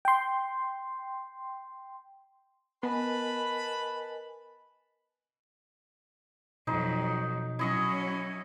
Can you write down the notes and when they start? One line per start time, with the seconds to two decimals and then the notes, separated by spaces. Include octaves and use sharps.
0.05 G5 C6
2.83 B3 A#4 B4 D#5 G#5 A5 B5
6.67 F2 B2 F#3 D#4
7.59 F#3 C#4 E4 D#5 C#6